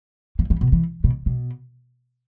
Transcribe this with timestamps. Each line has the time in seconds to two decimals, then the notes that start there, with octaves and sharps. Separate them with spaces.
0.39 E3
0.50 E3
0.61 B2
0.72 E3
1.04 B2
1.26 B2